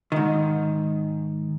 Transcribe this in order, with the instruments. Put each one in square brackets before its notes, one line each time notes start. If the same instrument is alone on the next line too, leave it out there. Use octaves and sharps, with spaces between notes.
[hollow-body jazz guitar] G#2 D#3